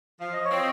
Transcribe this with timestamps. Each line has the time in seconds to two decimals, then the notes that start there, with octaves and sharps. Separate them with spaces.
0.20 F3 F5
0.33 D#5
0.45 C#5
0.51 C4
0.56 D#5